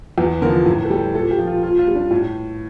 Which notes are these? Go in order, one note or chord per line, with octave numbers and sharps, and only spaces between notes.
E2
D3 F3 A#4
A2
A4
G3 G4
A#2 A4
G4
F3
F4
A#2 F4
F4
G3
D4
A2